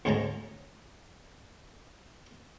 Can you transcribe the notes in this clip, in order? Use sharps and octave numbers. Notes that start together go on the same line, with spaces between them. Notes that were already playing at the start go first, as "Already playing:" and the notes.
D2 G#2 C#4 D#4 A5 A#5